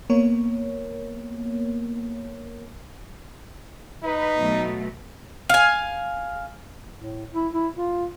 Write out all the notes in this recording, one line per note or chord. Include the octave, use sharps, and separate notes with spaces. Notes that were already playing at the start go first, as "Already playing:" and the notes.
A#3 B3 A#4 C#5
D#4 B4
B2 F#3 A3
F5 G#5
A2
E4
E4
F4